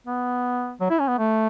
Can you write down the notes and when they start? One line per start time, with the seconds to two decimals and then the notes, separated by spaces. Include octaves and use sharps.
0.07 B3
0.81 F#3
0.90 E4
1.00 C#4
1.08 B3
1.18 A3